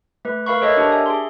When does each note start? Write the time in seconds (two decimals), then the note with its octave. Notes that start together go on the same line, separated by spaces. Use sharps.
0.25 A3 B4
0.46 A#4 B4 F5 B5 C#6
0.61 A4 A#4 C#5 D#5 E5
0.77 D4 G4
0.92 E5 G#5
1.06 G#4 C6